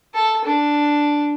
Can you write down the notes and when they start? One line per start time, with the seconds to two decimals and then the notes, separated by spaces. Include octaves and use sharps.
0.14 A4
0.45 D4